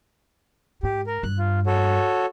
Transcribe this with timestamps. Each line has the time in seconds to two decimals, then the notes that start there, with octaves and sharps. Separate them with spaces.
0.83 G#2 G4
1.07 A#4
1.23 G2 F#6
1.38 F4
1.66 F#4 A4 C#5